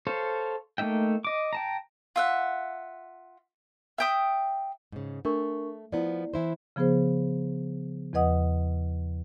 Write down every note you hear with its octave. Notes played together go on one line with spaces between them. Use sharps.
A4 C5 C#5 F5
A3 A#3 D#4 E5 G5
D#5 D6
G5 A5 A#5
F4 E5 F#5
E5 G5 D#6
G#2 C#3
A3 D4 A#4 C#6
F3 B3 E4 D5
E3 E4 C5
C#3 F3 B3 G#4 C5
E2 F3 B4 D#5 F#5 D#6